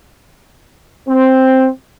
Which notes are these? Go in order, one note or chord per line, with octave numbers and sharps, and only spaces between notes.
C4